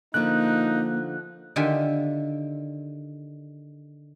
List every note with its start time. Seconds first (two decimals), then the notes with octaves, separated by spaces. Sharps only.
0.14 D3 F3 A#3 D#4 F#6
1.56 D3 D#3 F4 G4 E5 G#5